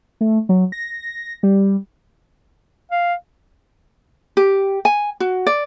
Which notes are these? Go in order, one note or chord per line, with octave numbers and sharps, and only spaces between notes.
A3
F#3
A#6
G3
F5
G4
G#5
F#4
D5